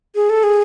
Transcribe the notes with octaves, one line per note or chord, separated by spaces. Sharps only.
G#4
A4
G#4